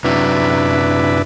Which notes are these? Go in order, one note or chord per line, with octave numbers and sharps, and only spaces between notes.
F#2 C3 F#3 D4 E4 B4